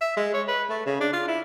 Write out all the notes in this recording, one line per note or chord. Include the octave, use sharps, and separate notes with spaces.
E5
G#3
C#5
B4
A3
C#3
D4
F4
E4